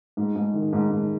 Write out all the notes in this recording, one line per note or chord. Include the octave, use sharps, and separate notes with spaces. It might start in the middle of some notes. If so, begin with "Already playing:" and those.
G#2
G#2
D#3
G#2
G#2